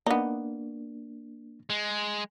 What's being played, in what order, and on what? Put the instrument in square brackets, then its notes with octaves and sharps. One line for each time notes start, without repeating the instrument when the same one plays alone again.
[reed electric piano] A#3 D4 [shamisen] B3 D#4
[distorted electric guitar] G#3